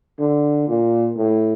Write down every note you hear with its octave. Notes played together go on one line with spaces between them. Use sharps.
D3
A#2
A2